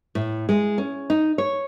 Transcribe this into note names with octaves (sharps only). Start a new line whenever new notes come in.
A2
G#3
C#4
D#4
C#5